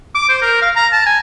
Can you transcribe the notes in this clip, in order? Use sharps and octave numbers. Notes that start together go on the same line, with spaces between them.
D6
C5
A#4
F5
A#5
A5
G#5